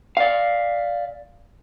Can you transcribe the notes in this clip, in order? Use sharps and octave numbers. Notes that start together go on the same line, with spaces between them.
D5 F5